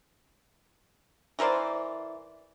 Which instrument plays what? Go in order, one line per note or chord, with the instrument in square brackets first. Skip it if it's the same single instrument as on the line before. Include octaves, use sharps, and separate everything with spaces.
[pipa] E3 A#4 C5 D5